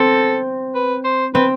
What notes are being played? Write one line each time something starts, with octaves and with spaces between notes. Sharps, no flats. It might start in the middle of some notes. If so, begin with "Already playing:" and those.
Already playing: C4 A4
B4
C5
C4 B4